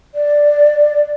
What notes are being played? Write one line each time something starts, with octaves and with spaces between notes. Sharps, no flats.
D5